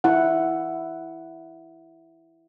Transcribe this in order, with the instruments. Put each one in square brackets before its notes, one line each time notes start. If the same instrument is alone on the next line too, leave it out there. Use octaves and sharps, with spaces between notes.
[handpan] E4 F#5